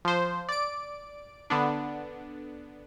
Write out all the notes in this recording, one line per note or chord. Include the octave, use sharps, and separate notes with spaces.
F3 C5
D5 D7
D3 B3 D4